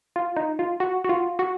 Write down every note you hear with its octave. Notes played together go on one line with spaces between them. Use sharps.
F4
D#4
F4
F#4
F#4
F4
F#4